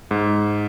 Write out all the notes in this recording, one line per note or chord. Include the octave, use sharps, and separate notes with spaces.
G#2